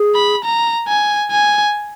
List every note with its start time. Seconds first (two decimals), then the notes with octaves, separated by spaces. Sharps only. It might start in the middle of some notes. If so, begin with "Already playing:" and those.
Already playing: G#4
0.15 B5
0.44 A#5
0.88 G#5
1.31 G#5